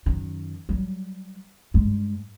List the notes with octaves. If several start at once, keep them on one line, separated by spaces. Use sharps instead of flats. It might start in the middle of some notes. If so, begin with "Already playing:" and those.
F#2 D#3
F#3 G3
G2 G#3